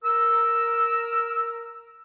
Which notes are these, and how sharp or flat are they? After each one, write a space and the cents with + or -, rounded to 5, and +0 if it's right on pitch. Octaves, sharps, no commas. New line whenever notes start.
A#4 +0 E6 +0